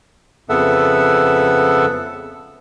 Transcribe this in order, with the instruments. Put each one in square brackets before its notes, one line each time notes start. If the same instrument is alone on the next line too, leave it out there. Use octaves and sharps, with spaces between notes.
[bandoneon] F2 C#3 B3 A4 E5 F#5